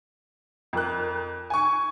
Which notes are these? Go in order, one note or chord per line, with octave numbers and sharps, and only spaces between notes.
F2 A#4 F#6
G#5 C#6